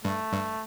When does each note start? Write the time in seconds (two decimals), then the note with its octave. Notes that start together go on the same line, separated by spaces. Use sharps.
0.05 G2 A3
0.33 G2